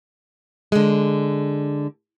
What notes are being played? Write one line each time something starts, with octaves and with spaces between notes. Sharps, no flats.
D3 G#3